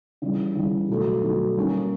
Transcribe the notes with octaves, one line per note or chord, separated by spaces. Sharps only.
C#3 E3 G3
C#3 E3 G3
B2 F#3 A3
B2 F#3 A3
G3 A#3 C#4